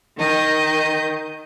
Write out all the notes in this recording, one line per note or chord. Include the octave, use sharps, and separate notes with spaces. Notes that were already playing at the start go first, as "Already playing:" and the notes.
D#3 D#5 G6